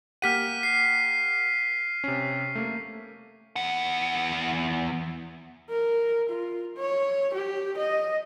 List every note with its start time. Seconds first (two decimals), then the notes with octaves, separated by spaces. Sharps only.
0.22 A#3 G4 F#5 F6 B6 D#7
0.63 C7
2.04 C3 C#4
2.55 A3 A#3
3.56 E2 F#5
5.70 A#4
6.29 F4
6.76 C#5
7.34 G4
7.77 D#5